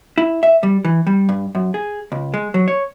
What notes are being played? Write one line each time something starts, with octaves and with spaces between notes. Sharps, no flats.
E4
E5
G3
E3
G3
G2
F#2
G#4
C#2
G#3
F#3
C#5